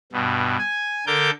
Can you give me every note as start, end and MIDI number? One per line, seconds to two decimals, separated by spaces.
0.12 0.57 43
0.12 0.57 47
0.58 1.05 80
1.07 1.31 50
1.07 1.31 69
1.07 1.31 70
1.07 1.31 86
1.07 1.31 91